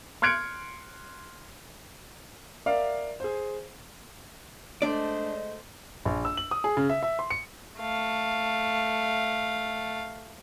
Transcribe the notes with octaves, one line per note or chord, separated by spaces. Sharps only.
C6 F6 F#6 G#6 C#7 D7
A#4 D5 E5 F5
G#4 C5
G#3 A3 D4 C5 D5 D#5
A#1
E6
F#7
D#6
G#4
C#3
E5
E5
C6
C#7
A3 F5